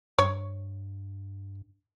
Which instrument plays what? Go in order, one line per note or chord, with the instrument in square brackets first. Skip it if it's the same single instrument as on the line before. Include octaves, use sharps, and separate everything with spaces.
[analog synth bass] G2 [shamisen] C#5